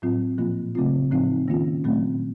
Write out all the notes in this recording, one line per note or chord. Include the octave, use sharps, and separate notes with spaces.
A2 F#3 C4 F4
A#2 F3 A#3 F4
C#3 F#3 A3 C4 F4
A2 F3 C4 D#4
D#3 A#3 C#4 F4
A#2 F#3 A3 C4